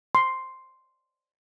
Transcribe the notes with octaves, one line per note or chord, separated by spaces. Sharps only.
C6